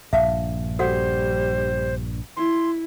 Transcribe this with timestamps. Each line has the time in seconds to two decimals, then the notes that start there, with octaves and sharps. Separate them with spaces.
0.13 A#1 G2 E5 F5 A5
0.79 G3 F#4 A4 C5 F#5
2.37 E4 C6